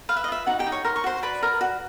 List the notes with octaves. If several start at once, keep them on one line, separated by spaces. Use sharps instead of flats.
B4 F5
E5
D#5
F4 E5
D#4 F#4 F#5
G4 G5
D#4
C#5 C#6
A#4 C6
C#6
F#4 C5 C6
B4 D5 B5
A#4
F#4